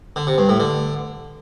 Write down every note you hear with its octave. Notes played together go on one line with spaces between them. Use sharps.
D3
C3
G2
A2
D3